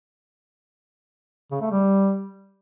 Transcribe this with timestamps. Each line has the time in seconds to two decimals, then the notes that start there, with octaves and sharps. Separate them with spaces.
1.51 C#3
1.61 A3
1.71 G3